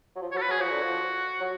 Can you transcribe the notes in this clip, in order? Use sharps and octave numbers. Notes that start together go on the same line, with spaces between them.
F#3
F3
C#5
F#3
A4
B4
F#3 G#4
F3 F#4
D3
F3
F#3